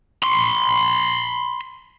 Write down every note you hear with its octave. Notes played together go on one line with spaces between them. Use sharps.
B5 C6